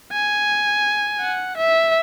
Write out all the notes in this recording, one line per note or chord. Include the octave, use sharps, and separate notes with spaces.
G#5
F#5
E5